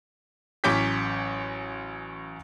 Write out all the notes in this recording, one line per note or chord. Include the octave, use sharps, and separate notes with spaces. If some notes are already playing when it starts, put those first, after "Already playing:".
A1 F#3 C#4 D6 G6 B6